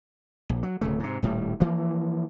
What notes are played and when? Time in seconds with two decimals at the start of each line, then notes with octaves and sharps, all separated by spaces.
0.49 A#1
0.63 F#3
0.81 D1 C#3 A3
1.00 G#2 C3
1.22 D#1 A2 G3
1.60 E3 F3 A#3